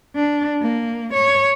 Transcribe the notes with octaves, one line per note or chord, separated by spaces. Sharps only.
D4
A#3
C#5